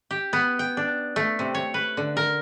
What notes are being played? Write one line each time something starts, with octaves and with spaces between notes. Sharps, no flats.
G4
B3
G5
D4
A3
C3
C#5
B4
D3
A#4